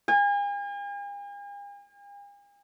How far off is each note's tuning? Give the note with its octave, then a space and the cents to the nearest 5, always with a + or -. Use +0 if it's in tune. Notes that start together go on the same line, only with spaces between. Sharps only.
G#5 -45